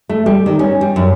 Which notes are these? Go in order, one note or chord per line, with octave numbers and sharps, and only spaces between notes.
A3
G3
D#3
C#4
G3
F#2